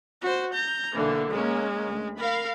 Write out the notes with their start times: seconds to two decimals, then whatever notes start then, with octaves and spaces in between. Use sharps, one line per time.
0.22 F#4 C5
0.54 A#5 G6
0.95 B1 D3 E3 A#3
1.30 G#3 A#3 C#4
1.86 D2
2.19 A#4 F5 B5